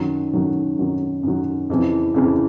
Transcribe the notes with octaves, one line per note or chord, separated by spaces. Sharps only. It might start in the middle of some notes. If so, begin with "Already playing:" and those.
Already playing: F#2 D#3 F#3
F#2 D#3 F#3
F#2 D#3 F#3
F#2 D#3 F#3
F2 C#3 E3
F2 C#3 E3